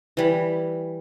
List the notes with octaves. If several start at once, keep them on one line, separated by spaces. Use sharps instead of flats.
E3 G3 B5